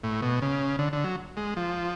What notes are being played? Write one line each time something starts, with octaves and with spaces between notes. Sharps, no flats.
A2
B2
C#3
D3
D3
F#3
G#3
F3